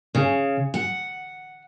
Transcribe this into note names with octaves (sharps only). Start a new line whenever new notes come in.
C#3
F#5